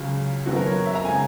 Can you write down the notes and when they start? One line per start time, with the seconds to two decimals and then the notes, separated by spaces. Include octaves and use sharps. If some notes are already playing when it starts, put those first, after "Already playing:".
Already playing: C#2 C#3 F#3
0.46 F#1 F#2 D#3 F#3 B3 F#4
0.56 A#4
0.65 C#5
0.86 E5
0.95 A#5
1.05 C#3 G#3 G#5